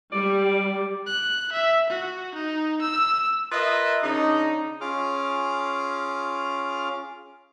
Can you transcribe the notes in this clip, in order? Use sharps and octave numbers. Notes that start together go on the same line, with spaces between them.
G3 D5
F#6
E5
F#4
D#4
E6
F4 A#4 B4 D#5 E5
C#3 D4 D#4
C#4 F4 G#4 D6 F6